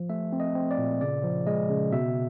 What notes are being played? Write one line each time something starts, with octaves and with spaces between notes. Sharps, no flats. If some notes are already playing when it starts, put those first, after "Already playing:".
Already playing: F3
A3 E5
C4
D#5
C4
D5
A#2
C#3 D5
F3
G#3 D#5
C#3
B2 E5